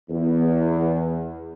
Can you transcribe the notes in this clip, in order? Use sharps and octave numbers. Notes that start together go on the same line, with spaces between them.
E2